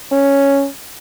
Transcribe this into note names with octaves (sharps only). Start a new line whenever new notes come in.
C#4